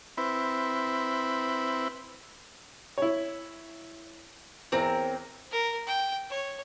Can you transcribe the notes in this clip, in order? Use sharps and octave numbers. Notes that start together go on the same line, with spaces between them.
C4 E4 B4
E4 C#5
E2 C4 C#4 A#4
A#4
G5
C#5